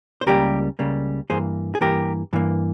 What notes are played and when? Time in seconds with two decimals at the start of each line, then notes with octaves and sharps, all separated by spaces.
0.21 C5
0.26 C#2 C#3 G3 A#3 G4 A#4
0.79 C#2 C#3 G3 A#3
1.30 G2 E3 A#3 G#4 C5
1.75 G#4
1.81 G2 E3 A#3 G4 A#4
2.33 G2 E3 A#3